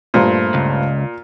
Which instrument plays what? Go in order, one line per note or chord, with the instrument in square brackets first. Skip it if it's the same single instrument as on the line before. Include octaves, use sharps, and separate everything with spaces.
[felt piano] G2 A3 C5 [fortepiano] A#2
[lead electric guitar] C#2